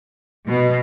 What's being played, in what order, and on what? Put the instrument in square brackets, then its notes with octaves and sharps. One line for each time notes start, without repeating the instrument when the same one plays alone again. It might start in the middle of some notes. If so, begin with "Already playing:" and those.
[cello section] B2